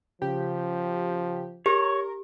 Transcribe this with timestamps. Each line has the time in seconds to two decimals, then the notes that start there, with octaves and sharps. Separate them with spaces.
0.22 C#3 F3 G4
1.66 G4 A#4 C#5